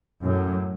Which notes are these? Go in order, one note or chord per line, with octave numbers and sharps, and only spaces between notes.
F#2 A2